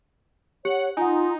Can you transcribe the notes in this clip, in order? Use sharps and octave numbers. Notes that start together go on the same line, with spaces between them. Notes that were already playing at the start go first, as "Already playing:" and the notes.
G4 C#5 F#5
D#4 F4 F#5 G#5